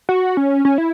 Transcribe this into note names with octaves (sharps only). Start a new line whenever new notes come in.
F#4
C#4
C#4
E4